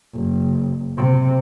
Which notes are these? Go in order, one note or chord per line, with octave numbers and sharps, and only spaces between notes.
F#1
C3